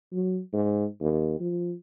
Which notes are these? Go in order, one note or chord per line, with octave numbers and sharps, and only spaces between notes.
F#3
G#2
D#2
F3